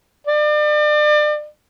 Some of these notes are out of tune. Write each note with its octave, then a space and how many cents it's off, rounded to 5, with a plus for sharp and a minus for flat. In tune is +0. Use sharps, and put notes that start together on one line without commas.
D5 +35